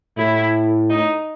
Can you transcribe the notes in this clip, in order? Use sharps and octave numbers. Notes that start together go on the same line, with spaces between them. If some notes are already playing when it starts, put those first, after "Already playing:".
A2 E4
D#4